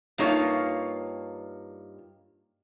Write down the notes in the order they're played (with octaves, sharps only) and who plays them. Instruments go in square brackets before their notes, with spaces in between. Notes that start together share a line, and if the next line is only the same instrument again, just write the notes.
[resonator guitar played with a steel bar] G2 A#3 D#4 F4 C#5